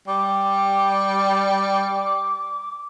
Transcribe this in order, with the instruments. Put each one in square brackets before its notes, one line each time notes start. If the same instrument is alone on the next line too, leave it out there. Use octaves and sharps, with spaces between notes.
[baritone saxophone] G3 [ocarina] D6